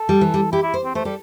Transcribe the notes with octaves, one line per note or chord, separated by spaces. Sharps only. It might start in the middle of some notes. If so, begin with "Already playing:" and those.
Already playing: A4
G3
E3
G3
E4 G4
E4
C5
C4
A3 C5
G3 A4